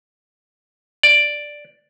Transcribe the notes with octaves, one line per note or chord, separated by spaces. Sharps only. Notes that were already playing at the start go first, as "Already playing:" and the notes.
D5